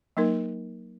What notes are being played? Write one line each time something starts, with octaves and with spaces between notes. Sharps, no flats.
F#3 A#3 D#4 A#4